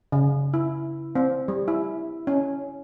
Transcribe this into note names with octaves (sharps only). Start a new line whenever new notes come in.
C#3
E4
C4
G3
E4
C#4